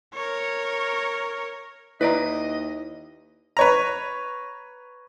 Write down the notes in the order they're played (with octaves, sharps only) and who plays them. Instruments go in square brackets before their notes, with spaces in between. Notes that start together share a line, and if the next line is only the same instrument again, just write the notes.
[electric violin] A#4 C#5
[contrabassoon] D#2 [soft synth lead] E4 [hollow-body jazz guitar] B4 D5 A#5 [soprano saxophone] D#5
[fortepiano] B4 C#5 A#5